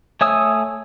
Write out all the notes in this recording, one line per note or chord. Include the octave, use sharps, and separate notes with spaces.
A3 C#5 G#5 D#6 E6